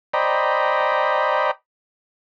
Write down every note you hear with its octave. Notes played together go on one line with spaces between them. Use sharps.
C5 D5 D#5 G5 A#5 B5